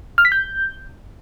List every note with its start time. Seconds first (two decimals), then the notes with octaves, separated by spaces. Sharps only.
0.18 F6
0.25 B6
0.32 G6